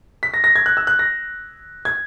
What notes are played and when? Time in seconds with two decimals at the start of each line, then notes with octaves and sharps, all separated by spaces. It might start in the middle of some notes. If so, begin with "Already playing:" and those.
0.23 B6
0.34 A#6
0.44 A#6
0.56 G#6
0.66 F#6
0.77 E6
0.87 F#6
0.99 A#6
1.85 G#6